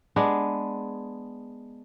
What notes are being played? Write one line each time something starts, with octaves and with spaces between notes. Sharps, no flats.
G#3 B3 D4